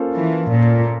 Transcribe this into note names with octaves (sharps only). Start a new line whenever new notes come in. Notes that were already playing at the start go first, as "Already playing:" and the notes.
Already playing: A#3 C#4 F4 A4 C5
E3
A#2